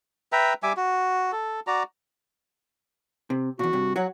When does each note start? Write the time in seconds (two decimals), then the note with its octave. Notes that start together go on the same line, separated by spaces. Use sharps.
0.32 B4 E5 G5 A#5
0.63 G3 E5 G#5 D6
0.77 F#4
1.32 A4
1.67 F#4 D5 A#5
3.30 C3
3.59 E2 A#2 F#4
3.73 G2 C3
3.96 F#3 F#4 C#5 F#5